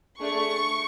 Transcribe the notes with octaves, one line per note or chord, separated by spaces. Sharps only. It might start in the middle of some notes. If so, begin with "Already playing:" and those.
A3 D4 G#4 C#6